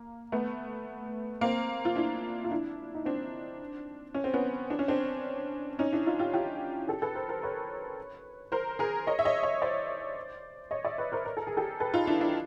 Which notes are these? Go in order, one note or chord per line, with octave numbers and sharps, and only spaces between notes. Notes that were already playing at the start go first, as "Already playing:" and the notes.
Already playing: A#3
A3 B3
A#3 C4
F4
D4 E4
F4
D4 E4
D#4
C4 D4
C#4
C4
B3 C#4
D4
C#4
C4 D4
C#4 D#4
D4 E4
D#4 F4
F4 G4
F4 G4
G4 A4
A4 B4
A#4 C5
A#4 C5
B4 C#5
A#4 C5
G#4 A#4
C#5 D#5
E5
C#5 D#5
C#5 D#5
C5 D5
C#5 D#5
D5 E5
B4 C#5
A#4 C5
A#4
A4
G#4
G4 A4
A4 B4
D#4 F4
D4 E4
D4 E4